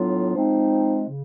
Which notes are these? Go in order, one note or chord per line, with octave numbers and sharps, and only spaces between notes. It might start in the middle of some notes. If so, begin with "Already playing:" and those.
Already playing: A2 F#3 B3 D4 F4
F3 G#3 C4 D#4
C#3